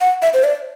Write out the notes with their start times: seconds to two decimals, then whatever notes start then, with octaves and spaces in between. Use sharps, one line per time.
0.01 F#5
0.22 E5
0.34 C5
0.44 D5